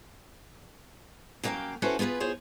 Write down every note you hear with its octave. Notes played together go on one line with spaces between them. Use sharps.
C#3 F#3 A#3 D5 F5 G5
C#4 E4 F#4 A4 B4 C5
B3 F4 G#4 A#4 B4
F4 G#4 C5 C#5